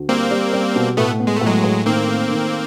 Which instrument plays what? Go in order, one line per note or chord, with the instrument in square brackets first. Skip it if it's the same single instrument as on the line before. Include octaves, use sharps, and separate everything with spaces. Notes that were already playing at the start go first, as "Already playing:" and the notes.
Already playing: [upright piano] D2
[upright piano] G3 [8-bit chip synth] A#3 C4
[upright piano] G3
G3
B2
[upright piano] A2 [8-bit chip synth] A3 B3
[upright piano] B3
[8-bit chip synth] G#3
A3
[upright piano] A2
[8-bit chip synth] F#3 G#3
[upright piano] A2
[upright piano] D#3 [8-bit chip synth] A#3 C4
[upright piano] A3
D#3